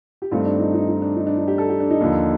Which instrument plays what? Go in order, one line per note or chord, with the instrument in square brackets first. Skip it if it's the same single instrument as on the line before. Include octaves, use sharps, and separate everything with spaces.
[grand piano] G4
G2 D#3 A3 C4 F4
D4
D#4
D#4
D#4
D4
D#4
D4
D#4
G4
A4
G4
D4
D#4
D#2 D3 F3 A#3